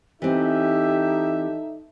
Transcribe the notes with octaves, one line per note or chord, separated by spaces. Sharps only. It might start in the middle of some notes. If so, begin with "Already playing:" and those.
E3 C4 D#4 G4 A4 E5